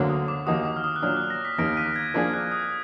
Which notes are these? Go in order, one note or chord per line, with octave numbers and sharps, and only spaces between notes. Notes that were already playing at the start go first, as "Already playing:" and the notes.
Already playing: D2 D3 F#3 A#3
D#6
D6
D#2 D#3 A#3 D#4 F#4 D#6
D6
F6
D#6
F#6
A#2 F#3 D4 F6
F#6
A#6
B6
D#2 D#3 A#3 A#6 D7
B6 D#7
G#6
F3 A#3 D4 G#4 G#6
F#6
D#6